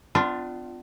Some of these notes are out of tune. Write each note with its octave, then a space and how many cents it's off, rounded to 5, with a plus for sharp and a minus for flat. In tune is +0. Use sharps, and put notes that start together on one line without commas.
B3 +45 D4 +10 F4 +0